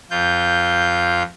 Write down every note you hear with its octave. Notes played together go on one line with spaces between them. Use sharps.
F2 F4 G6